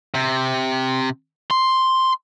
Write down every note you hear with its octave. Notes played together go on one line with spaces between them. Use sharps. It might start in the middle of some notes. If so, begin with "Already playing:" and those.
C3
C6